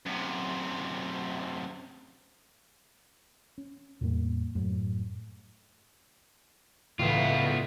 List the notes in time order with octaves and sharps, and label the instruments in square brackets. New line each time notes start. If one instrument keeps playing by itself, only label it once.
[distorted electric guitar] F#2 C3
[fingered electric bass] C#4
E2 A2 G3 A#3
F1 F#2 A2
[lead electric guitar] C#2 [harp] A2 E3 [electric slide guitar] B3 F4